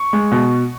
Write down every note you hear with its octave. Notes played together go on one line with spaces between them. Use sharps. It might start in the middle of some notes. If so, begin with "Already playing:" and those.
Already playing: C#6
G#3
B2